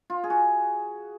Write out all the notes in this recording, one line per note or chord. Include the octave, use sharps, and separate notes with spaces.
F4
G#4
F#4